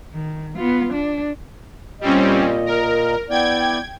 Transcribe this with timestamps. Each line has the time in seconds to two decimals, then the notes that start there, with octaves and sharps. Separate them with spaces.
0.12 D#3
0.56 B3 F4
0.93 D4
2.01 A#2 G3 C4 C#4 D#5
2.66 A#4
3.30 B3 E4 D5 G5 G#6